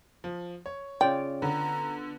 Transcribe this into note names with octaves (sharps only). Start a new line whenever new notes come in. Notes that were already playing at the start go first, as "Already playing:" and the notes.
F3
C#5
C#3 F4 D5 G5
D3 B3 A#5